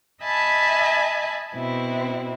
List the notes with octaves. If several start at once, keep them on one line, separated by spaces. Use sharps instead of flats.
D#5 E5 G#5 A5 B5
B2 C4 E4